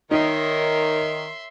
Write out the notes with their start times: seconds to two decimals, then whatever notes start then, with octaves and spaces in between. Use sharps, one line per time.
0.11 D#3 D#4 A#4 C#5 E5 C6